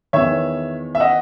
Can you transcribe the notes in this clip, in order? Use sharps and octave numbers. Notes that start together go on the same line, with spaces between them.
E2 D#3 C#5 E5
E5
D#5 F#5